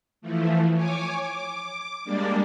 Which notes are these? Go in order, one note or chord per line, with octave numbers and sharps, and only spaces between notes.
E3 F3 A3
C#5 G#5 D6
D6
G3 G#3 A#3 D4 D5